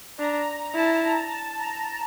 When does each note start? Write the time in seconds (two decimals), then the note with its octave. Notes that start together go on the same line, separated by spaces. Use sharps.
0.19 D4 A#5
0.75 E4 A5
1.03 A#5
1.32 A5
1.59 A#5